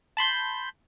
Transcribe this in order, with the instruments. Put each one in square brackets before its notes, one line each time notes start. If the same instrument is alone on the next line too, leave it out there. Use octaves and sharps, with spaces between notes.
[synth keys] A5 B5 C6 G6